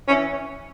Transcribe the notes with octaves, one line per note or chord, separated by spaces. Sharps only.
E3 C#4